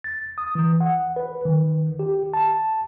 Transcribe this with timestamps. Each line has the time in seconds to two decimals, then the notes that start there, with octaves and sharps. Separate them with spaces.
0.04 A6
0.38 D#6
0.55 E3
0.80 F#5
1.16 B4
1.45 D#3
1.99 G4
2.33 A5